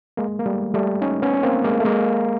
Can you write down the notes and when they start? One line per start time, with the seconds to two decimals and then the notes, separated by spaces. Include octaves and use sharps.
0.17 G#3 A#3
0.39 A#3
0.46 G3 A3
0.74 G3 A3
1.02 C#4 D#4
1.22 B3 C#4
1.34 C#4
1.43 A#3 C4
1.64 G#3 A#3
1.80 A3
1.85 G#3 A#3